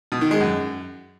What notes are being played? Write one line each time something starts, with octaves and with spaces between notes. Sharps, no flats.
B2
D#3
G#3
F#2